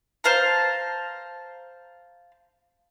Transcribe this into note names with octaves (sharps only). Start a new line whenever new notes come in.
C5 F5 A5 A#5